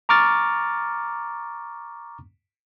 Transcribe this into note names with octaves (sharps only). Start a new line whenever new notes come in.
A#5 C#6 D6 F6 A6